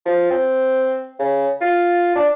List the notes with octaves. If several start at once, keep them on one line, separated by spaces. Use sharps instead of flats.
F3
C4
C#3
F4
D4